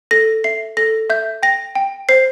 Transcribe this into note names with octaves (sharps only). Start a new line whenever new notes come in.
A4 A#6
E5 C7
A4 A#6
E5 G6
G5 A#6
G5
C5 C7